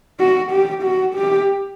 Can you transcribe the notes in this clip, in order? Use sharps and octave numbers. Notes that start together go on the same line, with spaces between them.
F#4
G4
F#4
G4